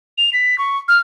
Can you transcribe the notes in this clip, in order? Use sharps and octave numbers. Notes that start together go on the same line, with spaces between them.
F7
B6
C#6
F6